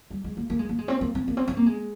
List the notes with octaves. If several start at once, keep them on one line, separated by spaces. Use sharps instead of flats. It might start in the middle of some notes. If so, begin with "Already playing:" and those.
G3
G#3
A#3
A#3
G#3
A#3
G#3
C4
A#3
C4
A#3
C4
C4
A#3
G#3